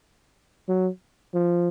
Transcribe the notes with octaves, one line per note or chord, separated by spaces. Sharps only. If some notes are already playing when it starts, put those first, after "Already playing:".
F#3
F3